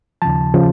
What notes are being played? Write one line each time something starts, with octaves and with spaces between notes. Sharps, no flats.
D#2 C#3 F3 A5
C#3 F3